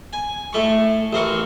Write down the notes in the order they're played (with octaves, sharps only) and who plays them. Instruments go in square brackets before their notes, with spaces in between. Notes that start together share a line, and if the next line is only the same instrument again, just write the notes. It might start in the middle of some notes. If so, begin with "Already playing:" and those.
[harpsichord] G#5
A2 A3 C#6
A1 C4 A#4 C#6